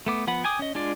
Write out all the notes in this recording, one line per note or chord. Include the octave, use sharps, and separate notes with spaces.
A3 B3 D6
F3 B3 F#5 B5
G5 G#5 D6 D#6
C#4 D#5
G#3 D4 F4 D5